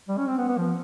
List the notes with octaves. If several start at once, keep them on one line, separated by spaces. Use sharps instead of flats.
G3
C#4
C4
B3
B3
F3